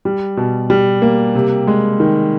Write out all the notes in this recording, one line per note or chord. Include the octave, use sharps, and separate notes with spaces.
G3
B2
G3
A#3
C3
G#3
D#3